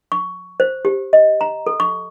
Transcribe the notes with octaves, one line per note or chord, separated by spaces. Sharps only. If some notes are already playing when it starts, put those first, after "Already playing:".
C#6
C5
G4
D#5
A#5
A4
C#6